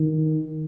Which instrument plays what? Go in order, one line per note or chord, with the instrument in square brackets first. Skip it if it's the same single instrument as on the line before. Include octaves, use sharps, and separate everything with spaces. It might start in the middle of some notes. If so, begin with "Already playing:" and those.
Already playing: [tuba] D#3